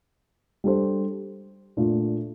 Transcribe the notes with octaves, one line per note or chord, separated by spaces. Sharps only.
G3 D4 A4 C5
A#2 A3 D4 F4